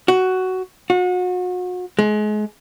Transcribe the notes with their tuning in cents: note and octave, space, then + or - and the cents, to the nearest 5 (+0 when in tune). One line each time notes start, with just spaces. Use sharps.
F#4 +10
F#4 -35
G#3 +30